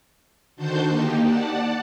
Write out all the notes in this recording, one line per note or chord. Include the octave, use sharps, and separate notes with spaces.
D3 D#3 F#4 C5 A5 G6
A#3 D#4 G4
D5 F#5 A5